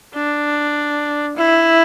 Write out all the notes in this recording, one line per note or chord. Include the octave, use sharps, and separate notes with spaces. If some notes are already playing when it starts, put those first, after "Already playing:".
D4
E4